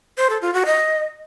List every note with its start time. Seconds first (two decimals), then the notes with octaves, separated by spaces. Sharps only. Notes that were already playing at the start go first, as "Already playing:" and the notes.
0.18 C5
0.30 A4
0.42 F4
0.54 F#4
0.66 D#5